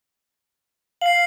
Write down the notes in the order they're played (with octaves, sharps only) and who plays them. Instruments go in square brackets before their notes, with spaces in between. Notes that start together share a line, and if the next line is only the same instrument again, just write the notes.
[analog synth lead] F5 [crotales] C7 F#7